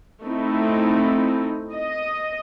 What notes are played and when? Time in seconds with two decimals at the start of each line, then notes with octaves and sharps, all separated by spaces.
0.23 A3 C4 D#4 E4
1.73 D#5